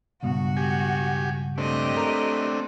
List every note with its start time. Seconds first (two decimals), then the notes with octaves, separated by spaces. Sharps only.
0.23 C#2 G2 B2 F#4
0.57 G4 G#5
1.58 A3 C4 D4 G4 D#5
1.97 A4 A#4